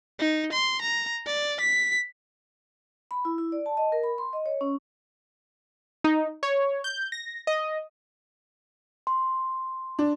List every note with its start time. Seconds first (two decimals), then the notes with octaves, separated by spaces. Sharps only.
0.19 D#4
0.53 C6
0.82 A#5
1.27 D5
1.61 B6
3.11 B5
3.25 E4
3.38 E4
3.52 D5
3.66 A5
3.77 D#5
3.92 A#4
4.03 B5
4.18 C6
4.33 D#5
4.46 C#5
4.61 C#4
6.04 D#4
6.43 C#5
6.84 G6
7.12 A#6
7.47 D#5
9.07 C6
9.99 D4